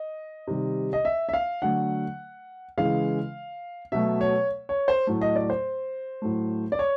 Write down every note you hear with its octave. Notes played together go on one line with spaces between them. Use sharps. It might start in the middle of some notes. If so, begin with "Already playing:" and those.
Already playing: D#5
C3 D#3 G3
D#5
E5
E5
F5
D3 F#3 A3 F#5
C#3 E3 G#3 F5
B2 F#3 A3 E5
C#5
C#5
C5
A2 F#3 A3
D#5
D5
C5
A2 F#3 A3
D5
C#5